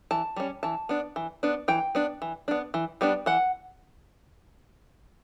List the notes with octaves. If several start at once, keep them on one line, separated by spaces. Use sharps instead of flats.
E3 A5
G3 C#4
E3 A5
B3 D4
E3
B3 D4
E3 G5
B3 D4
E3
B3 D4
E3
G3 B3 D4
E3 F#5